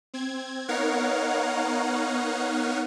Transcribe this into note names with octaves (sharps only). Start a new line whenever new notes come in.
C4 G#6
B3 D#4 A#4 C#5 F5 F#5